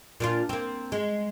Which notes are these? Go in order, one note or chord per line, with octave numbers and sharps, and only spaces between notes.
A#2 D4 F4
A#3 C4
G#3